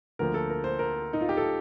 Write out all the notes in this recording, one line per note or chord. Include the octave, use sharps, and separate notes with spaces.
D2 D3 F3 A#3 A#4
A4
A#4
C5
A#4
D#4
F4
G4
A4